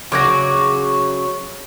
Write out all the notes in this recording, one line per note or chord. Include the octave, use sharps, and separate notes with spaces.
C#3 F#3 F#4 D6 G#6 A#6